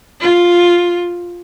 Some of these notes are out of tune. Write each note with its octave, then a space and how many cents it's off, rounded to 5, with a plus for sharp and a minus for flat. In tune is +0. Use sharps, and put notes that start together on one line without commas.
F4 +5